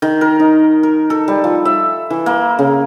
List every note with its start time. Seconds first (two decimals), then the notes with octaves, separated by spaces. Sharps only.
0.02 D#3
0.21 A#4
0.40 D#4
0.83 A#4
1.10 A4
1.28 G3
1.44 F3
1.65 E5
2.10 E3
2.26 A#3
2.59 C#3